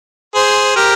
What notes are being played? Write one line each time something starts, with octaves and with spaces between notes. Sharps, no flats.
G#4 C5
G4 A#4